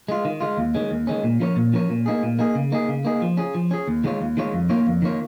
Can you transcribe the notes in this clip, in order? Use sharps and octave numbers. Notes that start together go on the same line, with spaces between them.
G#3 F4
D#3
G#3 F4
D#2
D#3 G#3 C#4
D#2
D#3 G#3 C#4
A#2
F3 C#4 A#4 C#5
A#2
F3 C#4 A#4 C#5
A#2
A#3 D#4 G#4
A#2
A#3 D#4 G#4
C#3
A#3 D#4 G#4
C#3
A#3 D#4 G#4
F3
C#4 G#4
F3
C#4 G#4
D#2
D#3 G#3 F4 C#5
D#2
D#3 G#3 F4 C#5
F2
D#3 A#3 F4 C#5
F2
D#3 A#3 F4 C#5